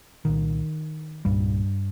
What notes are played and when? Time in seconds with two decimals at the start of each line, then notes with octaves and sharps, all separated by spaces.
0.25 C2 A#2 D#3
1.25 C2 G2 A#2 G3